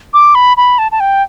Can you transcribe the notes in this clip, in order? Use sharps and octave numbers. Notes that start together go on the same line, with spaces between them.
D6
B5
B5
A5
A5
G5